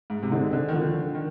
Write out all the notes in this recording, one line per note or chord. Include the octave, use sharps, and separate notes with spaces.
G#2
C3
D3 G#3 C4 D#4
D3
D#3
D3 F3
D#3